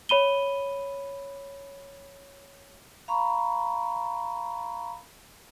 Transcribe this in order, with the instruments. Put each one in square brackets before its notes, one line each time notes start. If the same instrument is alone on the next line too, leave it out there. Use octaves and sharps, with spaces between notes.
[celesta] C#5 B5 D#7 G7
[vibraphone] F5 A#5 B5 C#6